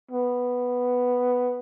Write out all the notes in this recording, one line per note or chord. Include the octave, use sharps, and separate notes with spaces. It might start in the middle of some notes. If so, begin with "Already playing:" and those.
B3